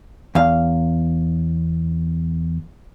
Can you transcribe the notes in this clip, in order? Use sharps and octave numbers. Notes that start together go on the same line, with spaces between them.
E2 F5